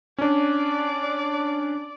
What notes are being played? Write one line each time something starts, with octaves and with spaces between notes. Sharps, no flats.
C#4 D4 D5